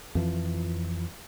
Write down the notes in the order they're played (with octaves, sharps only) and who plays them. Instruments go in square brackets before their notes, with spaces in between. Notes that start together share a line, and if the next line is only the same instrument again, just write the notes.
[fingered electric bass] F2 E3 F3